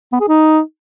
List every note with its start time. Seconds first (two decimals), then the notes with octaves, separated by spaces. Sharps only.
0.12 B3
0.20 G#4
0.29 D#4